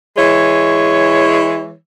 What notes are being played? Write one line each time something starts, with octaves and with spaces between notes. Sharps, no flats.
E3 G#3 C#5